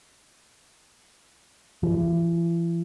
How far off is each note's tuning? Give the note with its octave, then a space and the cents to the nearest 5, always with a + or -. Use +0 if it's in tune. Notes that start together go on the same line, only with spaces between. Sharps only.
E3 +40